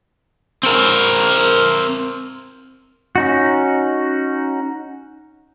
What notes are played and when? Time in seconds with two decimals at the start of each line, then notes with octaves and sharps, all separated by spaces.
0.63 C4 A#4
3.16 C#4 D#4 F#4